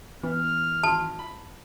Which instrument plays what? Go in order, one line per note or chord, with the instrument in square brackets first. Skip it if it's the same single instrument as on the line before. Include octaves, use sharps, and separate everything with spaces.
[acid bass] E3 [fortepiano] B3 [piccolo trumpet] F6
[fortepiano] G#1 C6 [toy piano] A5
[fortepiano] B5